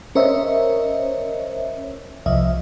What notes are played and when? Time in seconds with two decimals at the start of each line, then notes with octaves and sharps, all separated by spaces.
0.15 C#4 A#4 C5 C#5 D#5 E5
2.26 C2 F3 D#5 E5